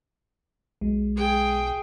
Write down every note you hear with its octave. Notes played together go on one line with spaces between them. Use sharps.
B1 G#3
G#4 G5